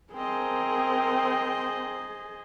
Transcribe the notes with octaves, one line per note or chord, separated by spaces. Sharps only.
C4 G#4 A#4 C5 D#5